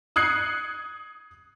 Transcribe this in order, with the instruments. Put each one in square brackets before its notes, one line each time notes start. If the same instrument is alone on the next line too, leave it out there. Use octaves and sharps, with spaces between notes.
[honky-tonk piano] D#6 F#6 G#6 C7 C#7